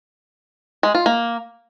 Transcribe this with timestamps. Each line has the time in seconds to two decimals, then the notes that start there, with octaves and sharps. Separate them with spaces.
0.83 G#3
0.95 F4
1.06 A#3